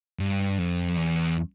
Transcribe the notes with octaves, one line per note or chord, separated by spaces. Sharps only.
G2
F2
E2